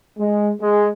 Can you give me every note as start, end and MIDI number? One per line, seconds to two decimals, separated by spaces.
0.19 0.51 56
0.61 0.89 56